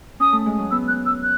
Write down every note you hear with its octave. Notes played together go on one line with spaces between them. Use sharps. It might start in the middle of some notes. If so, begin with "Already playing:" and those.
C#4 D#6
A3
G#3
F#3
B3 E6
F#6
E6
F#6